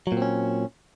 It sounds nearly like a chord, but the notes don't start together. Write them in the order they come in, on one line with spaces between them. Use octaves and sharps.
F#3 A#2 C4 C#4